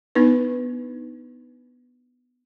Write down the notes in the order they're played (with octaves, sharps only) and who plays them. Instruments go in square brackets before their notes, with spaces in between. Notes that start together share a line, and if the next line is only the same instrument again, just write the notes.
[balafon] B3 D4 D#4 B4